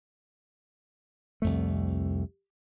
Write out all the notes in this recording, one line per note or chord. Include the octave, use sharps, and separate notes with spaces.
C2 F2 A3